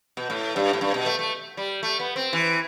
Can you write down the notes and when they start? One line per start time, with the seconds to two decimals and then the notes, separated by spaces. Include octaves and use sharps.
0.17 B2
0.30 A2
0.56 G2
0.73 A2
0.81 G2
0.94 B2
1.06 A3
1.19 A3
1.57 G3
1.83 A3
2.00 B3
2.16 C4
2.33 E3